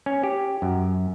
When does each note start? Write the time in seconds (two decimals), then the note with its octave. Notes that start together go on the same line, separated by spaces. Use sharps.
0.06 C#4
0.23 G4
0.62 F#2